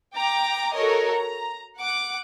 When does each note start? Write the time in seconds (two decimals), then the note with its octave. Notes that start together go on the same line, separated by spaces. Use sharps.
0.16 G5 A#5 D6
0.75 F#4 A4 A#4 C#5 D#5
1.14 A#5
1.78 F#5 D6